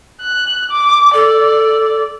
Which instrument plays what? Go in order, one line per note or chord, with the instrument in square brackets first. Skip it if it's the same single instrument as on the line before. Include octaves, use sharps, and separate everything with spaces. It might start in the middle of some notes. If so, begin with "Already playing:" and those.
[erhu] F#6
D6
[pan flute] A4 [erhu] D5